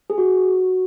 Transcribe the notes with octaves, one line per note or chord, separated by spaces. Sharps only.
G#4
F#4